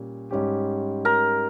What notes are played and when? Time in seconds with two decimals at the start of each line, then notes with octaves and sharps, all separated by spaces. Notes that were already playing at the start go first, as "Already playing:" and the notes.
Already playing: A#2 G3 C#4
0.31 G#2 G3 C#4 G4
1.05 A#4